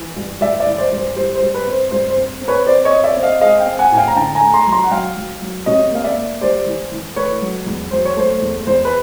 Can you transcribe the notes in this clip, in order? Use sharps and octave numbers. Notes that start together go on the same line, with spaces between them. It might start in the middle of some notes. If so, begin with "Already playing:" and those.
Already playing: E3
G2
G2 D5 E5
D5 E5
E3
C5 D5
G2
C5
G3 C5
C5
G2
B4
C4
C5
G2 C5
C5
C4
C4
B4 C#5
C4 C5 D5
C#5 D#5
C4
D5 E5
C4
D#5 F5
G#3 D#5 F5
F5 G5
C4
F#5 G#5
A2 G#5
F5 G5
A#5
D3 G5 A5
G#5 A#5
A3
A#5 C6
F#3
A#5 C6
F#5
F#3 F5 G5
F#3
F#3
C3 C#5 D#5
A#3 F5
D5 E5
A#3
G3 C5 D5
E3
E3
A3 B4 C#5
F#3
E2
F#3 C5
C#5
A3 C5
E2
E2 C5
B4